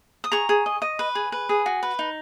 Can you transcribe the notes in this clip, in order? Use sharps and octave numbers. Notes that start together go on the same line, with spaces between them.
D#6
G#4 A#5 C#6
G#4
D#5
D#5
B4
G#4
B4
G#4
F#4
B4
D#4